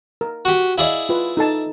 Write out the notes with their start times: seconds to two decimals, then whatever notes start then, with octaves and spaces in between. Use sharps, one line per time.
0.21 A#4
0.45 F#4 G4
0.78 E4 G#4 D5 D#5 F5
1.09 F4 B4
1.37 D#4 A4 A5